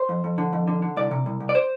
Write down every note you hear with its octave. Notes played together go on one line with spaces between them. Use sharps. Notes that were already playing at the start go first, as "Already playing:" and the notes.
Already playing: C5
F2
F2
D3
F2
D3
D3
C2 D5
C3
C2
C2
D5
C5